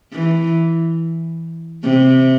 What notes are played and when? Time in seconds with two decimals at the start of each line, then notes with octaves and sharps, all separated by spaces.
0.12 E3
1.84 C3